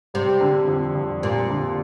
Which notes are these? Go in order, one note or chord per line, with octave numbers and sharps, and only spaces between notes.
C3 G3
D3
F2
F2
A#2 G3
D3